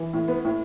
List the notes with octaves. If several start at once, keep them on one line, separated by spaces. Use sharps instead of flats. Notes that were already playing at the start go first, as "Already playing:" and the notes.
Already playing: E3
A2
B3
A2